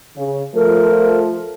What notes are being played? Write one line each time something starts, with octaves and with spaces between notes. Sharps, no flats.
C#3
F3 A3 A#4